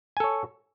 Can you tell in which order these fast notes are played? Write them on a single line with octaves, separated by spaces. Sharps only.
G#5 A4 C#5